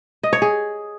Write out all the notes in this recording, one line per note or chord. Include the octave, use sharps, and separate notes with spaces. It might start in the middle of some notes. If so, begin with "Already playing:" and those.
D#5
C#5
G#4